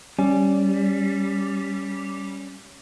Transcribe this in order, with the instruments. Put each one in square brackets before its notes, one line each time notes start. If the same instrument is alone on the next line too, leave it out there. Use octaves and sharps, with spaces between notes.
[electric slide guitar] G3 [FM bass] C#4